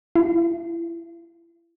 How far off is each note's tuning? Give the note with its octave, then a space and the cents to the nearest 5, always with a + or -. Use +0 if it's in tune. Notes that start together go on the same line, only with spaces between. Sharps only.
E4 +30